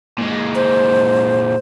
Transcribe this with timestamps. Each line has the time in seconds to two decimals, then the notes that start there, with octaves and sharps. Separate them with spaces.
0.18 A#2 G#3
0.55 C5